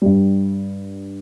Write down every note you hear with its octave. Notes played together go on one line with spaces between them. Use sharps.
G2 G3